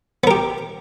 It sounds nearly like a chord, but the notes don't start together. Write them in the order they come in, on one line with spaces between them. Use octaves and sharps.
B3 A#4 G4